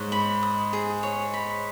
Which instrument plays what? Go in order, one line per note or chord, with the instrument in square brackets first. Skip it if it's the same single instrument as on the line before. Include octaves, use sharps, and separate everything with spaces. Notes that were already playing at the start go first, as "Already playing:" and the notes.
Already playing: [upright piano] G#2 [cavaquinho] C#5
[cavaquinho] B5
D#6
G#4
C#5
B5